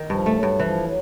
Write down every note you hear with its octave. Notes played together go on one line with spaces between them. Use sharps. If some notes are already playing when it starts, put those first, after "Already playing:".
Already playing: D#3
G2 F3
A3
F#3
G2
E3 F3
F#3